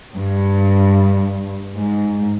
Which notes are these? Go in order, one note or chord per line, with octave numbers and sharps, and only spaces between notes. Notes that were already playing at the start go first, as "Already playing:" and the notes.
G2
G#2